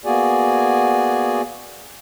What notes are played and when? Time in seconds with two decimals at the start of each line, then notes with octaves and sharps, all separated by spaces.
0.05 A#3 B3 F#4 G#4 D5 G#5